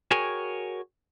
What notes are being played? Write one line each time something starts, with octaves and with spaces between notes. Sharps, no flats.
F#4 G#4 A#4 C#5 G5 G#5